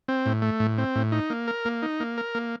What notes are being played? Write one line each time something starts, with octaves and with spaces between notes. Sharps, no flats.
C4
A2
A3
A2
C4
A2
D#4
A#3
A#4
A#3
D#4
A#3
A#4
A#3